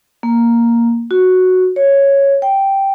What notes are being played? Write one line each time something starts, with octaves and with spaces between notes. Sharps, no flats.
A#3
F#4
C#5
G5